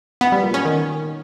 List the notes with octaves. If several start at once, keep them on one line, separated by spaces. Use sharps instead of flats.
B3
G3
A#2
C#4
D#3